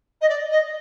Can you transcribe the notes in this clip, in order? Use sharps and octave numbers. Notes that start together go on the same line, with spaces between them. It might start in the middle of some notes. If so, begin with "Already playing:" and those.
D#5
D5
D#5